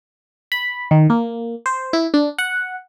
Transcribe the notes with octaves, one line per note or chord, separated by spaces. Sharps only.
B5
D#3
A#3
C5
E4
D4
F#5